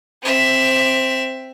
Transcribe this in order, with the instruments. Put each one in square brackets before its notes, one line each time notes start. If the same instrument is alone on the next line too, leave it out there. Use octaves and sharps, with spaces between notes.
[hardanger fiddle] C4 E5